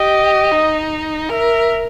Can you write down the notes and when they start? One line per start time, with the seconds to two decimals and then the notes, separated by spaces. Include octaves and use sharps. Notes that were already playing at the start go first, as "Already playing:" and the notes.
Already playing: G4 D#5
0.51 D#4
1.29 A#4 E5